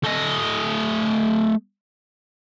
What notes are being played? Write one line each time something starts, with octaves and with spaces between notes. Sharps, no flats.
A3 D#5